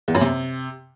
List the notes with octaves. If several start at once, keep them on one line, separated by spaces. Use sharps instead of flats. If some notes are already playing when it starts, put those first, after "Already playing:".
E2
F#2
C3